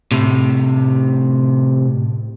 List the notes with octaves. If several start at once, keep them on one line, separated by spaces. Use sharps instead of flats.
A2 C3